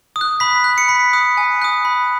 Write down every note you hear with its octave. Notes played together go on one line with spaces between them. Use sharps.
D#6
F#6
B5 B6
F#6
C#7
B5 B6
D#6 F#6
G#5
D#6 F#6
B5